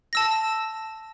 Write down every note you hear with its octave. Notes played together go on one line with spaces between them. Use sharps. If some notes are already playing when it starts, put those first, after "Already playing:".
A5 E6 A#6